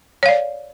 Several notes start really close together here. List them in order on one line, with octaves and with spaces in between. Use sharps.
C#5 F5 D5